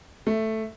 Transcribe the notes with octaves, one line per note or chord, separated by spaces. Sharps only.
A3